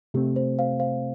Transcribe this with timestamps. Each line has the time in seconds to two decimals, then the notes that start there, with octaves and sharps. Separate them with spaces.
0.14 C3 A3 C4 G4
0.36 C5
0.59 C5 F5
0.80 C5 F5